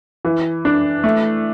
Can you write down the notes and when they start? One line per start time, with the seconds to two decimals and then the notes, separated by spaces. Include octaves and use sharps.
0.25 E3
0.65 D4
1.04 A3